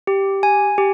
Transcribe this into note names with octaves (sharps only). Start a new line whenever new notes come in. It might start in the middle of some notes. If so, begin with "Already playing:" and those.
G4
G#5
G4